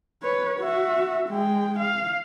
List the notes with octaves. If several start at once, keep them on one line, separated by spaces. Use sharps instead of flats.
B4 C#5
F#4 E5
G#3 G5
F5